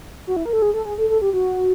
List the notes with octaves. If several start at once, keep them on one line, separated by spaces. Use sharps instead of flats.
F#4
E4
A#4
A4
G#4
A4
G#4
A4
A4
G4
F#4